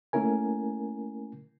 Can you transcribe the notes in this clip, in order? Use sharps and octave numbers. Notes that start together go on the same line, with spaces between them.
A3 A#3 C#4 E4 A#4 G#5